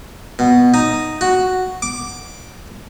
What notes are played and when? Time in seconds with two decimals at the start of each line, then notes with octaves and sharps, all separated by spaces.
0.39 B2
0.74 D#4
1.21 F#4
1.82 D6